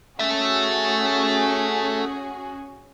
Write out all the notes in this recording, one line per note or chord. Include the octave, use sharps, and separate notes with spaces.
C#4 F#4 G#4 A4 E5